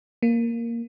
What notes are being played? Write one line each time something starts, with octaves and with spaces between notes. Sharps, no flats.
A#3